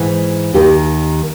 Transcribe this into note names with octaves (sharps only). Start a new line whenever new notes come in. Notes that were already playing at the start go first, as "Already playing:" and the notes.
Already playing: G#2 E3
D#2 D#3 G4